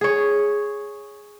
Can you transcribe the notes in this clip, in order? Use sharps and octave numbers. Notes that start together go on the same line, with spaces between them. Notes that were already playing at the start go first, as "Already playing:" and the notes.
G#4 C#5